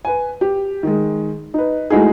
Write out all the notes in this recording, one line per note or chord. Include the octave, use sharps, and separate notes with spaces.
B4 G#5
G4
D#3 G#3
D#4 B4
G#3 A3 D#4 E4 F#4 G#4